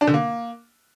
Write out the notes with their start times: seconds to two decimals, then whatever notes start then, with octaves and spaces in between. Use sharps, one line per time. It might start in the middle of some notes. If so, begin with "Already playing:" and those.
0.01 D4
0.07 D3
0.14 A#3